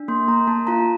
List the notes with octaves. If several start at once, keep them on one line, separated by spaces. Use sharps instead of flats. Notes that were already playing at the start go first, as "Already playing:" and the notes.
Already playing: D4
A#3 C6
A#3 A#5
A#3 A5
F4 A#5